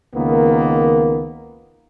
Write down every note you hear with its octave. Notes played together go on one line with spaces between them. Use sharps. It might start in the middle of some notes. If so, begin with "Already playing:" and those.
C#2 D#3 A#3 B3